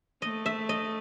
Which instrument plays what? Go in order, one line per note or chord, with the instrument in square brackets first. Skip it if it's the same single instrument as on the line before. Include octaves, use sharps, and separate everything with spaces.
[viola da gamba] A3 [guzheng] D#5
[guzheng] E5
D#5